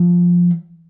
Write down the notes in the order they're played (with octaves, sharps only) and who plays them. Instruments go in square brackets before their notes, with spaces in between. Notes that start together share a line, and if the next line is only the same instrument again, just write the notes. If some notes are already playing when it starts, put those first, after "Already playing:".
Already playing: [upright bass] F3